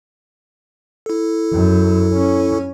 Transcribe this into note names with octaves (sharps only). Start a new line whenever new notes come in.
E4 A4
F#2
C#4